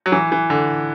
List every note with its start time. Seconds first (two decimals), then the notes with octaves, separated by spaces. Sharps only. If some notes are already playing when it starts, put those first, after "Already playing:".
0.06 F#3
0.12 E3
0.32 E3
0.50 D3